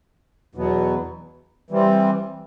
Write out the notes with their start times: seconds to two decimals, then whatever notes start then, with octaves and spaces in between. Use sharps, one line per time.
0.55 E2 B2 F#3 B3
1.70 E3 G3 C4